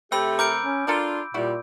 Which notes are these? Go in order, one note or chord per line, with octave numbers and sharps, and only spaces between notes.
C3 A3 C4 G4 B5 E6
A#4 D6 G6 D7
C#4
D4 F4 A4 A#4 D5
A#2 G3 E4 F#4